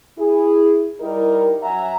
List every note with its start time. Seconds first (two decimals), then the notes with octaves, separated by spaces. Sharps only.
0.18 E4 G#4
1.00 G3 D#4 E4 G4 A#4
1.63 F#2 E5 F#5 G#5 A#5